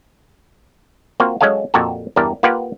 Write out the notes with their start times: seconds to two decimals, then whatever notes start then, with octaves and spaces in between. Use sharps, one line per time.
1.20 A#3 C4 F4 F#4
1.41 F#3 G#3 C#4 A4 F5
1.74 F2 A#2 F#4 G4 A4
2.16 E2 G2 D4 G4 A#4
2.43 A#3 F4 G4 B4 F5 F#5